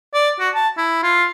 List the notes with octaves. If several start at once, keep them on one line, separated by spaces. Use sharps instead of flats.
D5
F#4
A5
E4
F4